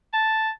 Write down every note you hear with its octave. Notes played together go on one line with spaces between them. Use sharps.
A5